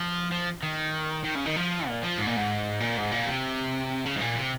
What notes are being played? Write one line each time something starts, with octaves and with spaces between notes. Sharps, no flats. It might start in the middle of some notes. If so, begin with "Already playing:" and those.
Already playing: F3
F3
D#3
D#3
C#3
D#3
F3
A#2
F3
G#2
A#2
G#2
A#2
G#2
A#2
C3
C#3
G#2
A#2
C3